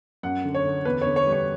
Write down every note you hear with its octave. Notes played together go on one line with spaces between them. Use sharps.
F#2 F#5
D3
C#5
D3
E2 B4
D3 C#5
C#5
G3
C#5